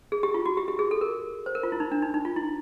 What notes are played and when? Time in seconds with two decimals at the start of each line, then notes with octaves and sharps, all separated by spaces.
0.12 G#4
0.23 G4
0.34 F4
0.46 F#4
0.57 G4
0.68 G4
0.79 G#4
0.91 A4
1.01 A#4
1.46 C5
1.55 A#4
1.63 F4
1.72 E4
1.80 D#4
1.92 D4
2.02 D#4
2.14 D#4
2.25 F4
2.36 E4